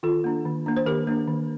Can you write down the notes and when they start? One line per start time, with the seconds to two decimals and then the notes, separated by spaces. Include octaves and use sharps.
0.03 D#3 F4 A4
0.24 A#3 D4
0.45 D#3
0.66 A#3 D4
0.77 C5
0.86 D#3 G4 A#4
1.07 A#3 D4
1.28 D#3